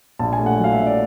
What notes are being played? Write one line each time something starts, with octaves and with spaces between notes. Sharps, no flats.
A#1 A5
G#5
A3
F#5
F#3 F5
E5
A#2
D5